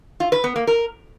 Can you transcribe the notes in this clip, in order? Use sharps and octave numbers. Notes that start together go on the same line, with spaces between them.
F4
B4
B3
A#3
A#4